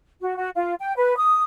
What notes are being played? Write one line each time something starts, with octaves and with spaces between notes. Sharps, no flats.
F#4
F#4
F4
G5
B4
D#6